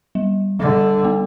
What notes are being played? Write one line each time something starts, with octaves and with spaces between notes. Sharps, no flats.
G3
D3 G3
B3